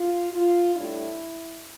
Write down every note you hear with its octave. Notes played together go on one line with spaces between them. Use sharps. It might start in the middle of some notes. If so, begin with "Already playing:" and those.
Already playing: F4
F4
A2 G3 D4 E4